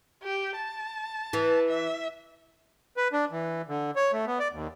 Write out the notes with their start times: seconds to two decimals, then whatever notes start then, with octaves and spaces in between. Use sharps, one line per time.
0.23 G4
0.56 A5
1.33 E3
1.67 E5
2.97 B4
3.13 D4
3.31 E3
3.68 D3
3.96 C#5
4.13 A3
4.27 B3
4.39 D5
4.53 D#2